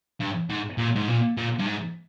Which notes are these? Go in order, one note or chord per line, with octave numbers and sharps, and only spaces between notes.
G2
G#2
A#2
G#2
A#2
A#2
G2
G#2